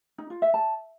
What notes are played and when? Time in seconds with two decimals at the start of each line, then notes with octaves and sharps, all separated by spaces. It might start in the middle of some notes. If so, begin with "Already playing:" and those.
0.18 D#4
0.30 F4
0.42 E5
0.54 A5